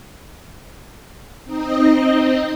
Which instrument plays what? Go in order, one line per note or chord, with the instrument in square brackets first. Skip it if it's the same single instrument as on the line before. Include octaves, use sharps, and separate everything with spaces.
[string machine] C4 D#4 D#5